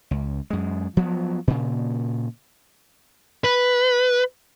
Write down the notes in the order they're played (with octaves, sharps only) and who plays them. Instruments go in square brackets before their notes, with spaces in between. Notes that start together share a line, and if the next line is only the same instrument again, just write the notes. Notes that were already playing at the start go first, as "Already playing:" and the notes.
[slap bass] C#2
F#2 G#3
F3 F#3 B3
A#2 C#3
[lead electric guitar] B4